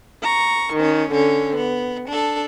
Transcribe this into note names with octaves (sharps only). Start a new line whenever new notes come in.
A#5 C#6
D#3 C#4
D3 C#4
B3
D4 A4